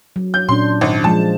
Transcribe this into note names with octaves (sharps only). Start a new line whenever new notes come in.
F#3
G6
A#2 C#4 D4 C6
G#1
F3 G#3 A5